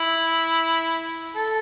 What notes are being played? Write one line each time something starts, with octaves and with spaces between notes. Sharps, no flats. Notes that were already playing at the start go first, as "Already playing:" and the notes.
Already playing: E4
A4